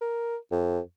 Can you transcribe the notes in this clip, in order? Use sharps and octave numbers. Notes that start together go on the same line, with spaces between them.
A#4
F2